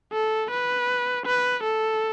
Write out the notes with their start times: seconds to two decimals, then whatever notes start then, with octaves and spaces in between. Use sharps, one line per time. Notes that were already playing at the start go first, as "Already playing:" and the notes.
0.13 A4
0.51 B4
1.26 B4
1.63 A4